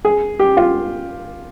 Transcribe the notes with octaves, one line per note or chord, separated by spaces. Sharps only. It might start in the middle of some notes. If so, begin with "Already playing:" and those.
G#4
G4
F4